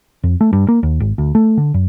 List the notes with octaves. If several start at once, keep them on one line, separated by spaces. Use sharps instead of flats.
F2
A3
G2
A#3
D#2
G#1
D2
A3
D3
F#2